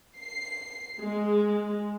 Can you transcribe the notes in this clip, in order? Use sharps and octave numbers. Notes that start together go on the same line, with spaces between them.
C7
G#3